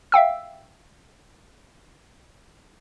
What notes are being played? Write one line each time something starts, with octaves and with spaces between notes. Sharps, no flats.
E5 F5 G5 E6